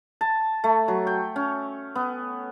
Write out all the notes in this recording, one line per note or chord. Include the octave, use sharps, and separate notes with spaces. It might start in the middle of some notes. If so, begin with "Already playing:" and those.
A5
A3
F#3
G5
C#4
B3